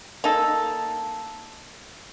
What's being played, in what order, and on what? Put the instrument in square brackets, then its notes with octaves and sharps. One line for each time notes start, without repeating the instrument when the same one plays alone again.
[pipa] A#3 D#4 A4